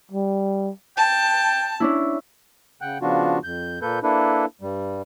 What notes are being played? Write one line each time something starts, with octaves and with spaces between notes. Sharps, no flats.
G3
G5 A5
C#4 D4 E4
C#3 F#5 G5 F#6
C#3 F3 B3 D4 F4 F#4
F2 G6
A#2 A#3 A4 B4 G6
A#3 D4 E4 A4 B4
G2 G3